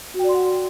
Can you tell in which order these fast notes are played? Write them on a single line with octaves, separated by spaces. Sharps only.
F#4 G5 D5 C6 F#5